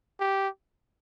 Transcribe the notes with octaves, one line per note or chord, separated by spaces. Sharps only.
G4